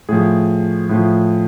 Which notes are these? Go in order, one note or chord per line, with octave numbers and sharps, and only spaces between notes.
A2 F3 G#4
A2 F3